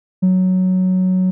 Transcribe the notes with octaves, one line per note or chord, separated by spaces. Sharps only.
F#3